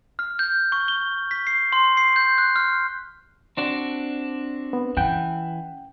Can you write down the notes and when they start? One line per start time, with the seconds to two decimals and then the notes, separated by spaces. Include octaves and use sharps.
0.19 F6
0.39 G6
0.72 C#6
0.88 G7
1.31 B6
1.47 C7
1.72 C6
1.97 C7
2.16 G6
2.38 F#6
2.56 F6
3.57 C4 D4 F#4
4.73 B3
4.97 E3 C#4 F#5 G5